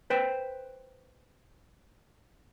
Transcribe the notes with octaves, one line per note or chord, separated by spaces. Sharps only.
B4 C5 G5